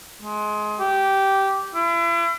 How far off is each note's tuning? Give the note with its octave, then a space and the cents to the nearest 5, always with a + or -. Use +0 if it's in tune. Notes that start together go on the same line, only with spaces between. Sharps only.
G#3 +20
G4 -10
E4 +40